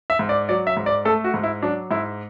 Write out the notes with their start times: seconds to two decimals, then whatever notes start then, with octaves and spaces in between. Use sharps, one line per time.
0.10 E5
0.19 G#2
0.29 D5
0.49 F#3 D5
0.67 E5
0.77 G#2
0.86 D5
1.05 A3 A4
1.24 F#4
1.34 G#2
1.43 E4
1.62 F#3 D4
1.91 G#2 E4